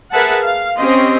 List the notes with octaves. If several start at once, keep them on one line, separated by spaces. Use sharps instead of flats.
G#4 A#4 B4 E5 F#5 A5
F5
C4 C#4 G4 D#5 C6